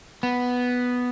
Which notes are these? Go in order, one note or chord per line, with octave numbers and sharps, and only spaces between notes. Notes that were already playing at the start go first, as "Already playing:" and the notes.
B3